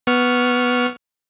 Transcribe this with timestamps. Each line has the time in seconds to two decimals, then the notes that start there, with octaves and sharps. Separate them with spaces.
0.07 B3 C#6 F6